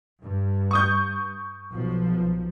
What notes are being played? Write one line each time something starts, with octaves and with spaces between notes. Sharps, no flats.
G2
C#6 D#6 G6
B1 F3